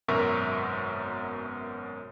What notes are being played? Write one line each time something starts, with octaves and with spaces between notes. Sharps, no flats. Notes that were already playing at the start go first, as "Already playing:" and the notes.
G#1 F#2 B2 A#4 E5 C#6